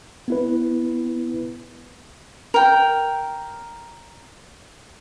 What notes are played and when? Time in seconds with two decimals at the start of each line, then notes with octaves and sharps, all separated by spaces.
0.28 B3 E4 B4
2.54 A#4 G5